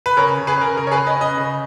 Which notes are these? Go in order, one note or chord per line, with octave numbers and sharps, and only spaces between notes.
B4
C#3 A#4 C#5
C#3
G#4 B4
C#4 A#4
C#3 A#4
C#5
G#4 B4
C#3
B4 D#5
C#4 B4 D#5
C#3